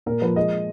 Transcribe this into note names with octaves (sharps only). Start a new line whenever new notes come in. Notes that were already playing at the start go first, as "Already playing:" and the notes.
A#2 A#4
F3 B4
G#3 D#5